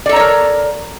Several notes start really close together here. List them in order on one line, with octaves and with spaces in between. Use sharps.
D5 A4 A#5 C#5 A#4